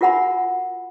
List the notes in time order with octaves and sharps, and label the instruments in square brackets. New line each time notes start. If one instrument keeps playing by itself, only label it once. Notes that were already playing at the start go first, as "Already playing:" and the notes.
[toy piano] F4 F#4 A#4 F#5 G#5 B5